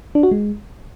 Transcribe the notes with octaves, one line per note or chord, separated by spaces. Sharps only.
D4
F#4
G#3